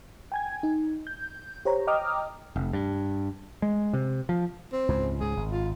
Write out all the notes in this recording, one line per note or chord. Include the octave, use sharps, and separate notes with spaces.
G5 G#5 G#6
D#4
G6
G4 C5 C#5 A#5
D#5 G5 A#5 D6 D#6 F6
F1
G2
G#3
C3
F3
C4
C#2 G#2
C#2 G#2 G#4
G#1
F4